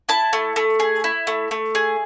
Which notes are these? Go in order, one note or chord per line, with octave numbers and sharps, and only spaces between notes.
E4 A5
A3
A3
G#4
E4
A3
A3
G#4